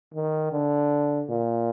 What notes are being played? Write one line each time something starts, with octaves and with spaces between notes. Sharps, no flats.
D#3
D3
A#2